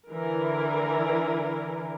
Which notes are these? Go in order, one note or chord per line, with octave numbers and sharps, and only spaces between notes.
D3 E3 E4 A#4